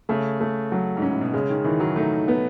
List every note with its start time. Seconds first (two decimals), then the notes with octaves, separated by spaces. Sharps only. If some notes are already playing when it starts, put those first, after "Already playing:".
0.09 C#3 A3
0.41 A3
0.72 F#3
0.97 G#2
1.02 C#4
1.09 A2
1.21 B2
1.34 C#3 G#3
1.49 D#3
1.64 D#3 E3
1.80 F#3
1.96 A3 D#4
2.28 B3